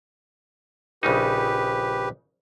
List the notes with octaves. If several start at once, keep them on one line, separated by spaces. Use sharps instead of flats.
A#1 C#3 D#4 G4 B4